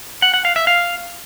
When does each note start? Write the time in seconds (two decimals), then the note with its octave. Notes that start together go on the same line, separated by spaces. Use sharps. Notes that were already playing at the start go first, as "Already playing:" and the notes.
0.22 F#5
0.34 F#5
0.45 F5
0.56 E5
0.67 F5